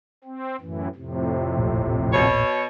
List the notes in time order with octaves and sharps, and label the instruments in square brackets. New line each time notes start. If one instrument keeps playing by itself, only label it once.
[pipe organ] C4
F#2 A2 E3
F2 A2 C3
[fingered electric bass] D#1 A1 A#2
[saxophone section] B2 C#5